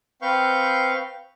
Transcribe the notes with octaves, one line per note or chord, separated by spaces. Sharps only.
C4 B4 F5 C#6 G6